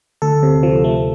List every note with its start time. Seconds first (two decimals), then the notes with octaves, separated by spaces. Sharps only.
0.22 D2 A4
0.43 C3
0.63 F3
0.84 A3